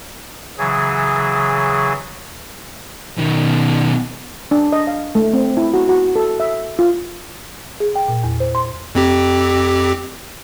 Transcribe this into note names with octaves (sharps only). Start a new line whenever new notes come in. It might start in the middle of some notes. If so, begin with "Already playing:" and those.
C#3 E3 F#3 G#4
B2 D#3
D4
D#5
F5
A3
C4
E4
F#4
F#4
A4
E5
F4
G#4
G5
A#2
E2
C5
C6
F2 C4 G4